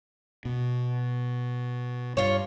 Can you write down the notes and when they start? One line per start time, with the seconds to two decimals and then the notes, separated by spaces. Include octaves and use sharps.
0.45 B2
2.17 G2 F4 C#5